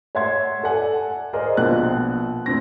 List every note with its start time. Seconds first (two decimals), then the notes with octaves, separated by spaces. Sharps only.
0.15 C#5 E5 F#5 C6 G#6
0.63 A4 D5 F#5 G#5
1.33 G#4 A#4 C5 D5 D#5
1.57 A#1 B2 F#6
2.46 F1 A2 C4 A#6